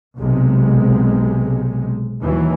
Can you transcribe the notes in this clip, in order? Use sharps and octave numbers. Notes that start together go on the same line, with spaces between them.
B1 C3 G#3
D#2 E3 F#3